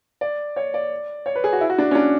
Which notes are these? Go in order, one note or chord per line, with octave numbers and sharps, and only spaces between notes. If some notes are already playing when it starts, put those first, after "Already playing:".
D5
C#5
D5
C#5
B4
G#4
F#4
E4
F#4
D4
C#4
D4